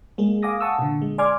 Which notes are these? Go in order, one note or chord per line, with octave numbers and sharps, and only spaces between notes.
G#3 A#3 G#4
F5 G#5 D6 D#6 A#6
F#5 A5 C#6 D#6 E6
A#2 D3
G#3
D5 G#5 C6 D6 F6 G#6